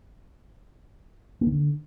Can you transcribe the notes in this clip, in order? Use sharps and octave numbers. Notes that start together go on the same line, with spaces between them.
A#3
D#3
D3